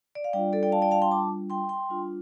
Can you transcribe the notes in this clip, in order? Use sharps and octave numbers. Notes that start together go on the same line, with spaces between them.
D5
F5
G3 D4 F4 D5 G5
A4 D5
D5 G5
F5 A5
D5 G5
F5 A5
G5 C6
A5 D6
G5 C6
G5 C6
G3 D4 F4